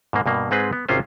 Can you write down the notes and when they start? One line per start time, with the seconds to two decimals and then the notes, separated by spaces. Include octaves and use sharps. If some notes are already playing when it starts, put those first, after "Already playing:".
0.13 G#2 B2 A#3
0.26 G2 B2 A#3
0.51 G#2 G#3 C4 G#4 B4
0.73 B3
0.89 G#1 C3 C#4 F4 C5